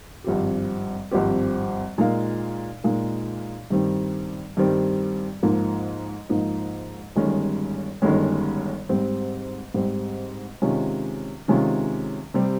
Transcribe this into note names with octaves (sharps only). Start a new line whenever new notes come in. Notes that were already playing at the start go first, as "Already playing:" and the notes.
G#1 G2 F3 C4 G4
G#1 G2 F3 C4 G4
A#2 G#3 D#4 A#4 F5
A#2 G#3 D#4 A#4 F5
G2 D#3 G3 C4
G2 D#3 G3 C4
G#2 F3 A#3 D#4
G#2 F3 A#3 D#4
G1 G2 D#3 G#3 C#4
G1 G2 D#3 G#3 C#4
G#2 G3 C4
G#2 G3 C4
C3 D#3 G#3 C#4 F4
C3 D#3 G#3 C#4 F4
C3 G3 C4